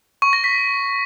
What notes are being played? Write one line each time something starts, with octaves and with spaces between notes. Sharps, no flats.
C#6
A#6
B6